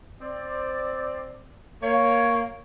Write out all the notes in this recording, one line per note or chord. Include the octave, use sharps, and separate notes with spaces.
C4 D5
A#3 C#5